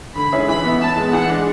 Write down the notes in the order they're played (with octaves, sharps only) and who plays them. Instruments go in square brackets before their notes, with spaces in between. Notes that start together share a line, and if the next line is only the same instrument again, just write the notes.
[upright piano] D3 [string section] B5
[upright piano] G#3 C#4 E4 G#4
[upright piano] E3 [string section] B5
[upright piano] B3 E4
[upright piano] E3 [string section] A5
[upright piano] G#3 B3
[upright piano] E3 [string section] F#5
[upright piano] G#3 D4